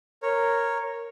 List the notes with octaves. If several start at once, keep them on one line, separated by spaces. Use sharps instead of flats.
A#4 C#5